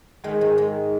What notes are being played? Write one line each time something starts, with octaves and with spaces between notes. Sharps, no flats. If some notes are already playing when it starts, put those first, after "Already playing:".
D#3 G#3
G#2 G#3
G#3